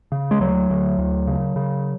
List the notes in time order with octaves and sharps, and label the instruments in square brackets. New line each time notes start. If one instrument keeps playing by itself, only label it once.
[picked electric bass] C#3
G#3
D2 F#3
D2
D2
C#3
C#3